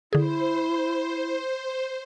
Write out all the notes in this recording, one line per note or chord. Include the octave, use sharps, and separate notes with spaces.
D3 E4 G#4 C5